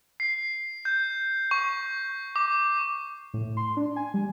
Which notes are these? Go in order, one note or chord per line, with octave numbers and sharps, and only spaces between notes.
C7
G6
C#6
D6
A2
C6
D4
G#5
G3